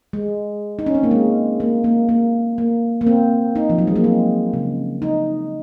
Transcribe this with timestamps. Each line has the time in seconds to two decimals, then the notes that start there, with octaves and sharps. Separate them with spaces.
0.13 G#3
0.79 D#4
0.86 C#4
0.95 C4
1.03 A#3
1.11 G#3
1.60 A#3
1.84 A#3
2.09 A#3
2.58 A#3
3.01 A#3
3.07 C4
3.56 D#4
3.70 F3
3.78 F#3
3.87 G#3
3.96 A#3
4.04 C4
4.53 C#3
5.02 D#4